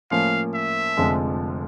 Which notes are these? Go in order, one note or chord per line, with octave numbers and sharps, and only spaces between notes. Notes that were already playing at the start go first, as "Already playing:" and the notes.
A2 F3 A#3 C#4 F5
E5
F1 F2 D3 F3 G#3